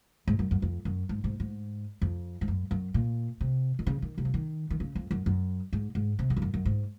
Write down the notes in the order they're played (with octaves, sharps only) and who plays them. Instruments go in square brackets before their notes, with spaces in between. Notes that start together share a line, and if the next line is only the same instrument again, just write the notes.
[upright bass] G#2
F#2
F#2
F2
F#2
G#2
G#2
G#2
F2
G#2
F#2
F#2
A#2
C3
D#3
C#3
D#3
C3
F3
D#3
D#3
C#3
F2
F#2
F#2
G#2
G#2
C3
G#2
F2
F#2
F#2
G#2